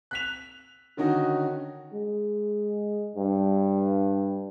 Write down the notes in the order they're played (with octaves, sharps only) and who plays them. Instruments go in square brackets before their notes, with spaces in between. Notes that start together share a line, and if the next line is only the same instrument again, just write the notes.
[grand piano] F#6 B6 F7
D3 D#3 C#4 D#4 F#4
[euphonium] G#3
G2